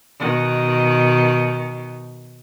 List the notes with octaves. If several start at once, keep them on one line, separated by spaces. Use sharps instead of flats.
B2 D#3